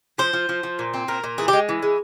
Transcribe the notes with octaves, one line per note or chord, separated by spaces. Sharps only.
F3 C5
F3
F3
F3
A#2
C4
A#2 A#4
A#2
E3 G#4
G4
G#3
E3
G#3